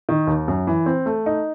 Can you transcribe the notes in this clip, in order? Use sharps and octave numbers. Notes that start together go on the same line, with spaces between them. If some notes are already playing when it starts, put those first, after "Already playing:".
D#3
D#2
F#2
E3
C4
A3
D#4